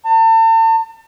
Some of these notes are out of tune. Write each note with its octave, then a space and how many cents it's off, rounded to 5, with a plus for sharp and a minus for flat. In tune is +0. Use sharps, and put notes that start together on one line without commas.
A5 +40